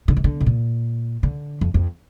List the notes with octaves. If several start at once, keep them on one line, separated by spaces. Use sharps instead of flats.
D3
D#3
D3
B2
A#2
D3
F2
F2